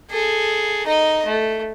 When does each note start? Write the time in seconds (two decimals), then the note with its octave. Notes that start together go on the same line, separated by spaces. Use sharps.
0.11 G#4 A4
0.87 D#4 D#5
1.26 A3